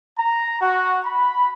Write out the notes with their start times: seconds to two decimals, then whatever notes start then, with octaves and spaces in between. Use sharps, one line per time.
0.19 A#5
0.61 F#4
1.05 B5